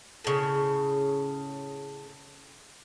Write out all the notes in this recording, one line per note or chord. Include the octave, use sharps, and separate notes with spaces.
A2 C#3